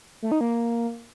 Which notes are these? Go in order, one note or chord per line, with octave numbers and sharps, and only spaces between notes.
A3
D#4
A#3